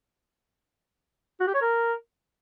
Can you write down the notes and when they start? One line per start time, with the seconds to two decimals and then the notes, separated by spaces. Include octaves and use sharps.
1.40 F#4
1.47 G4
1.54 C#5
1.61 A#4